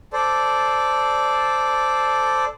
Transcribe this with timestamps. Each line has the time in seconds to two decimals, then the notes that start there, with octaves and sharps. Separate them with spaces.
0.13 A4 C5 D5